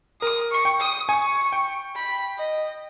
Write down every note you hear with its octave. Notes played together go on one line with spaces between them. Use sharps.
A#4 D#6
C#6
G5
D#6
G#5 C#6
G5
B5
D#5